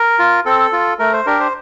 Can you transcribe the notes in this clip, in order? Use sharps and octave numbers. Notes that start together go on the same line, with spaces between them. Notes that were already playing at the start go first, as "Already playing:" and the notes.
Already playing: A#4
F4
C4 A4
F4
A3 A#4
C5
D4 G4 A#4
C5